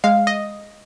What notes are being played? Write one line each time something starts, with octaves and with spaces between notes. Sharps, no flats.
G#3 F5
D#5